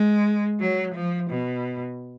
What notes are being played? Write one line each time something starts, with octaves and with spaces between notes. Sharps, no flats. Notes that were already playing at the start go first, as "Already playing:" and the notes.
Already playing: G#3
F#3
F3
B2